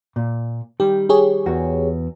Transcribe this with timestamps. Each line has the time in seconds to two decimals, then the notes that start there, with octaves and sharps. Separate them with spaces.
0.16 A#2
0.80 D#3 G3 G4
1.09 G4 G#4 C#5
1.46 E2 F#4